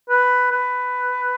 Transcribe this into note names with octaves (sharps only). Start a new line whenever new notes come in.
B4
B4